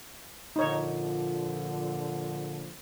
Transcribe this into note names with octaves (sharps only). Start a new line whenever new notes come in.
A#2 D3 F3 D#4 C#5